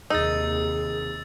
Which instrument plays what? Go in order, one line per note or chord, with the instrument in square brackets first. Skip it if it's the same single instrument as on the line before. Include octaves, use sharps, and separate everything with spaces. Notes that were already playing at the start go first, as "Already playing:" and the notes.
[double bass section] D#2 C3 [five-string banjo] D#4 [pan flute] G#4 [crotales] E6 A6